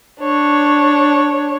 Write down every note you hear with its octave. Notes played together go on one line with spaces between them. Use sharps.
D4 C#5